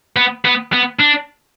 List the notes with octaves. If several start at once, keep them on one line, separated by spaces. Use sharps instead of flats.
B3
B3
B3
D4